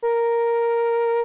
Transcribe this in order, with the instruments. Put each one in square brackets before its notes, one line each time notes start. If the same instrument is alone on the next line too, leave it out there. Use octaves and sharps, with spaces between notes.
[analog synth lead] A#4